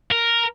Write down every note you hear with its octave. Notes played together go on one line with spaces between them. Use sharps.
A#4